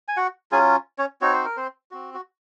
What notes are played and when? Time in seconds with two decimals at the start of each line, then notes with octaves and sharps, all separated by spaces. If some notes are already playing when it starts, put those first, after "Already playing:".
0.08 G#5
0.17 F#4 F#5
0.52 F#3 C#4 F4 G#4 G#5
0.98 C#4 C#5
1.21 C4 D#4 F#4 C#5
1.33 C5
1.45 A#4
1.57 C4 C5
1.91 C4 F#4
2.14 F#4